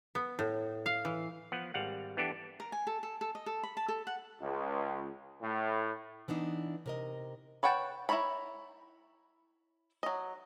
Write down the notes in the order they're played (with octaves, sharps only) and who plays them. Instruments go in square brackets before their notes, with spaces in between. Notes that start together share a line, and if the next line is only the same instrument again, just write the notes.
[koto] B3
A2
F5
E3
[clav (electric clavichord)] F3 B3 F#5
G#1 G3 F5 F#5
E3 B3 D4 G4 A4
[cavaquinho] A#4
G#5
A4
A4
A4
D#5
A4
B5
A5
A4
F#5
[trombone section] C#2
A2
[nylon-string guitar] E3 B3 D4 D#4
C3 A#4 D#5
[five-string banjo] B4 C#5 F#5 G5 A5
E4 F4 A#4 C#5 B5
F#3 D#5